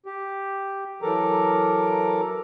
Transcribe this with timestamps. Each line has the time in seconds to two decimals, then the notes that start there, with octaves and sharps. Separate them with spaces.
0.06 G4
1.02 E3 F#3 A4 A#4 A#5 D6